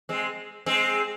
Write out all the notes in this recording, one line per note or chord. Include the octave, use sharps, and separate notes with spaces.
G#3 C4
G#3 C4